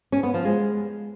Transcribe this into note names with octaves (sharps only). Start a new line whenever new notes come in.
C#4
B3
F3
G#3